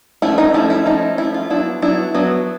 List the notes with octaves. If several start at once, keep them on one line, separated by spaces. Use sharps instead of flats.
F3 A3 C#4 E4
D#4
F3 A3 C#4 E4
E4
F3 A3 C#4 D#4
F3 A3 C#4 E4
F4
F#3 B3 D4 E4
F#3 B3 D4 E4
F#3 B3 D4